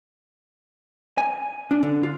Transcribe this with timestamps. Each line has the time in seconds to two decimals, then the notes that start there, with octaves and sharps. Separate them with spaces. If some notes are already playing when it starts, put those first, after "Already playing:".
1.18 G#5
1.71 D4
1.83 D3
2.03 F4